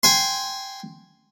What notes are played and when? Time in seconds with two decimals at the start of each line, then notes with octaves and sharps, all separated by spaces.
0.03 G5 G#5 C6